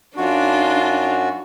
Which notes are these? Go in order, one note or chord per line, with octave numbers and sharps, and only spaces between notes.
F#2 D4 D#4 F4 F#4